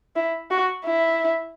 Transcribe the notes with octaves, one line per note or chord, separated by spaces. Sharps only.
E4
F#4
E4